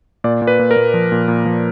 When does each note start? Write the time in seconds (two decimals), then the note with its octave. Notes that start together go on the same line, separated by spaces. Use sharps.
0.24 A#2 D5
0.42 A#2
0.47 B4
0.59 A#2
0.71 A#4
0.76 A#2
0.94 F3
1.12 A#2
1.28 A#2
1.46 F3